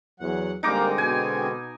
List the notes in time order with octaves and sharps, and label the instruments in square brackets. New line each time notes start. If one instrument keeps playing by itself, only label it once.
[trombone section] E2 [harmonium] F#3 F#5
[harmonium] D3 G#3 C4 [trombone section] G3 A#3 [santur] D#4 A#5 D6
[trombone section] B2 [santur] G#5